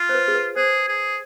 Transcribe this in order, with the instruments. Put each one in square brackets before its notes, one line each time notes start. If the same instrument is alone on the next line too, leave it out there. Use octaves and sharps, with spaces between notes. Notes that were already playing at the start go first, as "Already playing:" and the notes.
Already playing: [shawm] F4
[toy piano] C5
B4
G#4
B4
[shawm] G#4 [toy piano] C5
[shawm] G#4